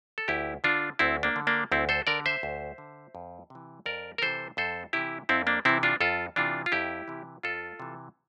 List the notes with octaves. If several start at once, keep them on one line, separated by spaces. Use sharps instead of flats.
A4
D2 E4 G4
D3 D4 F4
D2 C4 E4
A#3 D4
D3
A#3 D4
D2 C4 E4
A4 C5
D3 A#4 D5
C5 E5
D2
D3
F2
C3 E3
F2 A#4 D5
A#4
C3 E3 A4 C5
F2 A4 C5
C3 E3 E4 G4
F2 C4 E4
A#3 D4
C3 E3 C4 E4
D4 F4
F2 F4 A4
C3 E3 D4 F4
F4
F2 E4 G4
C3 E3
F2 F4 A4
C3 E3